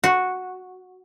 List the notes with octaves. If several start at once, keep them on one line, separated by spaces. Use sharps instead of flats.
F#4